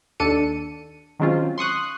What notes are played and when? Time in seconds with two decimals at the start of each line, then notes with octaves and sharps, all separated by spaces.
0.20 D#2 D4 A4 C#7 D#7
1.19 D#3 F#3 G#3 C4 C#4 F4
1.58 C6 C#6 D#6 F#6